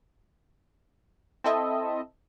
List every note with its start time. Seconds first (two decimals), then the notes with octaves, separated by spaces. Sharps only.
1.44 C4 E4 A4 D#5 E5